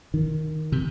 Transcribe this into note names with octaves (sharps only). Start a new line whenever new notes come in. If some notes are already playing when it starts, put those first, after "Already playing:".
D#3
C3